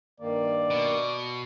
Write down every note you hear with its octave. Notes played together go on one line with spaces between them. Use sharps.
G2 D#3 A#3 D5
B2